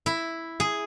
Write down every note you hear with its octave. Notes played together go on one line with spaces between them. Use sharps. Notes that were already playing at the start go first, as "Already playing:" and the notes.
E4
G#4